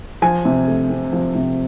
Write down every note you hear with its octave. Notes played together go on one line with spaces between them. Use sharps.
F3 G#5
C3
A3
C4
F3
C3